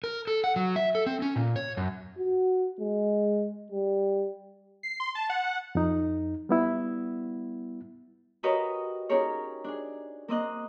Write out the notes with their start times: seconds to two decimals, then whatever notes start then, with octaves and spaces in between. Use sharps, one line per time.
0.04 A#4
0.27 A4
0.44 F#5
0.56 F#3
0.76 E5
0.95 A4
1.06 C4
1.22 C#4
1.36 A#2
1.56 C#5
1.77 F#2
2.18 F#4
2.80 G#3
3.72 G3
4.83 C7
5.00 C6
5.15 A5
5.30 F#5
5.75 F2 D#4
6.49 G3 B3 E4
8.43 F#4 G4 A#4 B4 C#5 D#5
9.09 C#4 D#4 G4 G#4 A#4 C#5
9.64 D4 G#4
10.28 A#3 C4 D#5 F#6